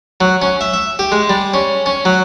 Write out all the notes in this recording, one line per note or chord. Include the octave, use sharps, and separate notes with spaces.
F#3
C#4
E5
E5
G4
G#3
G3
C#4
C#4
F#3